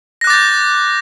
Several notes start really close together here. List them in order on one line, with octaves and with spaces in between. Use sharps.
A#6 F#6 D6 A6 G6